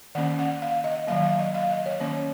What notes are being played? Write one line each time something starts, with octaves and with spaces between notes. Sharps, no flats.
D#3 A#3 C#4 F#5
F#5
F5
D#5
D#3 F#3 A#3 F5
F5
D#5
F5
D#5
C#5
D#3 A#3 C#4 C#5